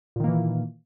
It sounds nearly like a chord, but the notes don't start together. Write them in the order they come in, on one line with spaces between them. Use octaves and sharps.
A#2 D#3 A#3 E3